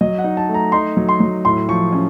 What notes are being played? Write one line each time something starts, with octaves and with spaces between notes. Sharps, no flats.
F#3 D#5
F#5
D#4
A5
A3
A#5
D#4 C6
F#3
C6
F#3
A2 C6
F3 C#6
C#4